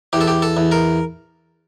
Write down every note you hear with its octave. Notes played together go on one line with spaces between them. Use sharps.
E2 G4
A4
G4
A4
E2
A#4